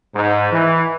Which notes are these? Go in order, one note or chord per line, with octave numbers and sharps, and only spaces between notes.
G#2
E3